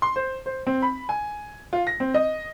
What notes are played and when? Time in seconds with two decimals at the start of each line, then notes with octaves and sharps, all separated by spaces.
0.02 C6
0.16 C5
0.46 C5
0.67 C4
0.82 B5
1.09 G#5
1.73 F4
1.87 A#6
2.00 C4
2.14 D#5